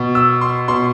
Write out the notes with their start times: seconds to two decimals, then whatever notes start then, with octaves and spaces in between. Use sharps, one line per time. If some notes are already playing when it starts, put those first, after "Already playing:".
Already playing: B2
0.15 E6
0.41 C6
0.68 B2 C6